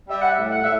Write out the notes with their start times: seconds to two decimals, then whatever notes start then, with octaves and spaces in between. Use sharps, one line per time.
0.08 G3 E5
0.21 F#5
0.30 E5
0.37 A2
0.50 F#5
0.63 A2 E5